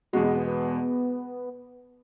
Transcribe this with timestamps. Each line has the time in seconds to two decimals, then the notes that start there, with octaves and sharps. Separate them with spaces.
0.13 E2 B2 G#3 F#4
0.24 B3
0.36 B3
0.47 B3